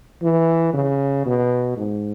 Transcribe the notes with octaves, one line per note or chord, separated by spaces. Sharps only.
E3
C#3
B2
G#2